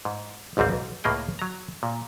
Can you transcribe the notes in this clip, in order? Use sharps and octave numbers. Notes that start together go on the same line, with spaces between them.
G#2
G#1 C#2 G#2 G3 C4
B1
C#2 A2 A#3 G#4 G5
F#3 A#5
A#2